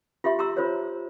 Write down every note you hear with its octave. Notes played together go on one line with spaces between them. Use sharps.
F4 G4 E5 C6
G4 A#5 C6 E6
F4 C5 C#5